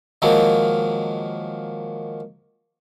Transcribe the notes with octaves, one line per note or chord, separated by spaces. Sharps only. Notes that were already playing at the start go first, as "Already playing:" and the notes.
D#3 F3 F#3 G#3 A#3